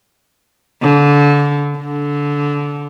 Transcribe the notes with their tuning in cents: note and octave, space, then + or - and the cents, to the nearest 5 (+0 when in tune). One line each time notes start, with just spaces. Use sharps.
D3 -25
D3 -20